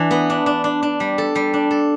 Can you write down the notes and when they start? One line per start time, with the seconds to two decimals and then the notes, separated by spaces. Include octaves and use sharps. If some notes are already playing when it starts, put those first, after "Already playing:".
Already playing: E3 D4
0.11 B3
0.30 D4
0.46 D4
0.64 D4
0.83 D4
1.00 G3
1.18 A4
1.36 G3
1.54 D4
1.71 A4